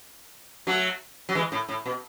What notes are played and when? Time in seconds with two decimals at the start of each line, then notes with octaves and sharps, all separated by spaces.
0.67 F#3 A3
1.29 F#3
1.35 E3 G#3
1.52 A2
1.68 A2
1.86 B2